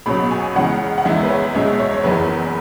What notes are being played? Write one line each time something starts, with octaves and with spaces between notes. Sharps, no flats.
C#2 B2 F#3 B5
G#5
C#2 C#3 E3 G#3 F#5
F#5
E2 E3 G#3 E5
B4
C#5
C#2 B2 G#3 E5
C#5
C#5
F#1 E2 E3 B4